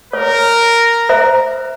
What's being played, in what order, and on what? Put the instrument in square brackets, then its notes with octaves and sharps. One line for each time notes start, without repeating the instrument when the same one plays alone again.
[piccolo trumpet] A#4 [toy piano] C#5
[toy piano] C5 E5 A#5